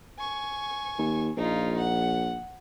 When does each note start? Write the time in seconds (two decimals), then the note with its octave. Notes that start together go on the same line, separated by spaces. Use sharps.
0.19 G#5 C#6
0.99 D#2
1.37 A#1 D#4 F4
1.78 F#5